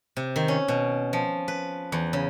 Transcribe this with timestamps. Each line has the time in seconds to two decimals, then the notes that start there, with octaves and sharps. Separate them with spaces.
0.17 C3
0.36 D#3
0.48 C#4
0.68 B2
1.13 F3
1.48 B4
1.92 E2
2.13 C#3